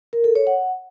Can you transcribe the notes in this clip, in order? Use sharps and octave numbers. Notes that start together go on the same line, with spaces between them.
A#4
A4
C#5
F#5